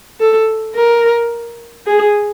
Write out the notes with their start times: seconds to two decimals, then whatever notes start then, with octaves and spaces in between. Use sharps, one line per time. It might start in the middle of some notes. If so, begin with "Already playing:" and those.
0.20 A4
0.75 A#4
1.86 G#4